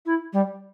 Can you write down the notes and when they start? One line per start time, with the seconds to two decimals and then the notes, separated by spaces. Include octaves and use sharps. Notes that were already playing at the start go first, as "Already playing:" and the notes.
0.05 E4
0.33 G3